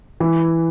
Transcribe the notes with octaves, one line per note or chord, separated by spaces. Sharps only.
E3